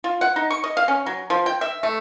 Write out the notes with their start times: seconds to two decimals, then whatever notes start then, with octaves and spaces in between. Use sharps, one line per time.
0.04 F4
0.21 F#5
0.36 D#4
0.50 C#6
0.64 D#5
0.77 F5
0.88 C#4
1.06 F#3
1.30 F3
1.46 G5
1.61 E5
1.83 A3